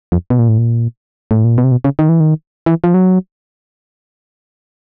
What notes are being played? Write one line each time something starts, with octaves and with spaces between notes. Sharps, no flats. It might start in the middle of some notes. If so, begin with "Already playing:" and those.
F2
B2
A#2
A2
A#2
A2
A#2
B2
C3
B2
C#3
D#3
E3
D#3
E3
F3
F#3